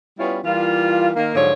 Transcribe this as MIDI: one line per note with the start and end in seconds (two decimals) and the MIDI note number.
0.18 0.39 55
0.18 0.39 59
0.18 0.39 61
0.18 0.39 64
0.18 0.39 65
0.44 1.09 52
0.44 1.09 55
0.44 1.09 58
0.44 1.09 65
1.15 1.31 51
1.15 1.31 58
1.34 1.52 44
1.34 1.52 50
1.34 1.52 53
1.34 1.52 54
1.34 1.52 73